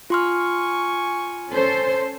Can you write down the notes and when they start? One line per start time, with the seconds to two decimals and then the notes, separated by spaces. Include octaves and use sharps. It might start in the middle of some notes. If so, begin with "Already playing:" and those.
0.10 F4 G#5 C6 C#6 F6
1.51 C#4 A4 C5